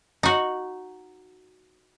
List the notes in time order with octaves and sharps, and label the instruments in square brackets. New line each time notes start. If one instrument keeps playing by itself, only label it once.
[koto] D#4 F#4